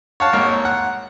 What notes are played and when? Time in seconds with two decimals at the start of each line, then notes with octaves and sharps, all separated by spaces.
0.20 C#5 F5 F#5 A5
0.33 G#1 A#3 C#5 F6
0.65 F#5